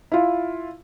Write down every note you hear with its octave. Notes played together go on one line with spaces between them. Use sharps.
E4 F4